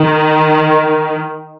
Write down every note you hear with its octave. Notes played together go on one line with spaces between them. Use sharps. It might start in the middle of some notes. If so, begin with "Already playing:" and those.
Already playing: D#3